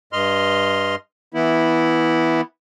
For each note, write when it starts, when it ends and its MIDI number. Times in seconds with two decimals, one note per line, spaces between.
0.13 0.95 43
0.13 0.95 75
0.13 0.95 84
0.13 0.95 89
1.34 2.41 52
1.34 2.41 59
1.34 2.41 64